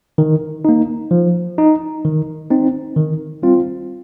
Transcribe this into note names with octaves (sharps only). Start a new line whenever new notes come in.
D#3
A#3 D#4
F3
D#4
D#3
C4 D#4
D#3
G3 C4 F4